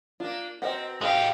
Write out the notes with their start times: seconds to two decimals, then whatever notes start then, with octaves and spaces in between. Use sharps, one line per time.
0.20 A#3 D4 F4
0.62 B2 C4 A#4 D#5 F#5
1.01 G#3 G4 A4 D#5 F5